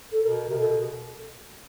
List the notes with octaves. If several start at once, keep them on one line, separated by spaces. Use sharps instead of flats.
A4
B2 A#4
C3 A#4
B2 A4
G#4